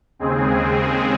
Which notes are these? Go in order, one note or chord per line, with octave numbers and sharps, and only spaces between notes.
D#2 C#3 G#3 C4 G#4